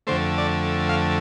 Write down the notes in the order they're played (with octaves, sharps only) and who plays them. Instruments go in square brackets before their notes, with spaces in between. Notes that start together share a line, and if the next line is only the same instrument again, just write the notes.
[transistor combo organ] F2 D3 A3 C5
D5
F5